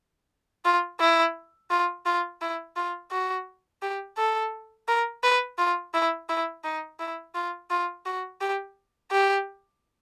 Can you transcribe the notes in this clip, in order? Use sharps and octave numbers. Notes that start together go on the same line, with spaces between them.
F4
E4
F4
F4
E4
F4
F#4
G4
A4
A#4
B4
F4
E4
E4
D#4
E4
F4
F4
F#4
G4
G4